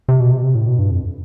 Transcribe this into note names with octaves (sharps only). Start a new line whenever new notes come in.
C3
B2
C3
B2
C3
A2
B2
G2
F2